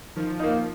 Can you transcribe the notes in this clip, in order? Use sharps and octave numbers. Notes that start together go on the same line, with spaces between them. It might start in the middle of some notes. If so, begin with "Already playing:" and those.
D#3 F3
A#3 D#4